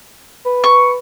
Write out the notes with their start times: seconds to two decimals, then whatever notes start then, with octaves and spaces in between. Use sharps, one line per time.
0.45 B4
0.64 C#6